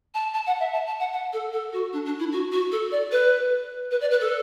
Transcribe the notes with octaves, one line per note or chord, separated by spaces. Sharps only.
A5
A5
F#5
E5
A5
A5
F#5
F#5
A4
A4
F#4
D4
D4
E4
F#4
F#4
A4
D5
B4
B4
D5
B4
A4